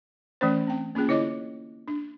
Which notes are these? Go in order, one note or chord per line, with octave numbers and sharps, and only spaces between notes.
E3 A3 C#4 C5
C4 G5
A#3 C#4 F4 G#4 G5
D3 E4 C#5 D#5 D6
D4